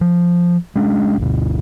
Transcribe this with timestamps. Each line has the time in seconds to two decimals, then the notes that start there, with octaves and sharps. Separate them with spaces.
0.01 F3
0.76 G#3 C#4 D4
1.18 G1 D2 B2